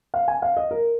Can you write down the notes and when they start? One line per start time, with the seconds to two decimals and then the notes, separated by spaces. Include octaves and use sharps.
0.14 F5
0.28 G#5
0.42 F5
0.57 D#5
0.71 A#4